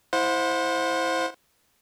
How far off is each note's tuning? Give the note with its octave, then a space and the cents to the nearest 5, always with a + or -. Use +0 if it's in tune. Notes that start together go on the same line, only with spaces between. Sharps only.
E4 -5 C5 +0 F#5 -35